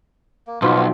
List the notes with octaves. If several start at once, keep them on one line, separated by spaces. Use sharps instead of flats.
A#3
B1 B2 F3 B3 F4
C4